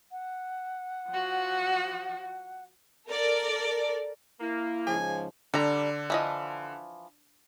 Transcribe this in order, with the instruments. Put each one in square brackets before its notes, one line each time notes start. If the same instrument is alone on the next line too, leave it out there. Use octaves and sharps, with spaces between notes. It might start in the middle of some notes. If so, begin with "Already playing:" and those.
[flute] F#5
[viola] F3 F#4
[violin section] A4 A#4 D5
[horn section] A#3 [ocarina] E4
[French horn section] G#2 C#3 F3 [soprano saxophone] G#5
[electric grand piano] D3 [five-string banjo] G3 A#5 [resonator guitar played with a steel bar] D4
[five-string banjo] E3 F3 D#5